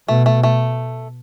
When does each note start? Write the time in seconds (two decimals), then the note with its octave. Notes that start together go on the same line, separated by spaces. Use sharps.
0.08 B2 A3
0.26 A3
0.43 A3